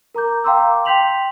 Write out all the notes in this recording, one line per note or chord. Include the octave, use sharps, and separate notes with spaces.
A#4 A#5 D6 G6
F5 G5 A#5 C6 D6 E6
D6
G5 C6 G6 B6 F7 F#7